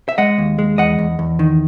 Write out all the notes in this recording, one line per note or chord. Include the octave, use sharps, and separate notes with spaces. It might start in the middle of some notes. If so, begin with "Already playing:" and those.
E5
G#3 D#5 F#5
D#2
G#3
E2 D#5 F#5
E2
E2
D#3